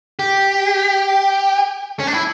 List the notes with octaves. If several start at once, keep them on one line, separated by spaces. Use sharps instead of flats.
G4
C#4
D4
E4